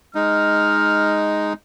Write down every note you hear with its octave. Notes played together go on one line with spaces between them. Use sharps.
G#3 D#4 F6